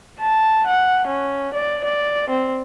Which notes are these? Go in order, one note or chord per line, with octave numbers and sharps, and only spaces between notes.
A5
F#5
C#4
D5
D5
C4